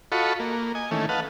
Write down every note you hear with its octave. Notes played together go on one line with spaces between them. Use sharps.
F4 F#4 A4 D#5 B5 C#6
A#3
D#5 G#5
D#3 E3 A3 C#4
B4 D#5 F5 F#5 A5